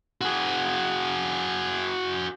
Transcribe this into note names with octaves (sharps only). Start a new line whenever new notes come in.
F#4 G#4